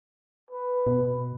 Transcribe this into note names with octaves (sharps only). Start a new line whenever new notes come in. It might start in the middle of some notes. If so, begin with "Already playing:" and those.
B4
B2